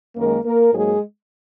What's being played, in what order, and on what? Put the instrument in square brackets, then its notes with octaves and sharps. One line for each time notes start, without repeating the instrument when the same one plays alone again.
[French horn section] F#2 D#3 G#3 A#3 A#4
A#3 A#4
G#2 F#3 G#3 A#3 G#4